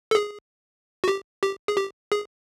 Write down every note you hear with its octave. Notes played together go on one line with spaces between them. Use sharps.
A4
G#4
F#4
G4
G4
G#4
G4
G#4